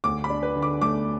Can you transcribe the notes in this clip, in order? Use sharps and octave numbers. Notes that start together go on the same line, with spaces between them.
D2 D6
B5
D4
B4
D3
D6
A3 D6